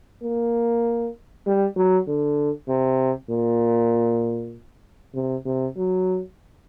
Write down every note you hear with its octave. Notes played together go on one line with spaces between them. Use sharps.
A#3
G3
F#3
D3
C3
A#2
C3
C3
F#3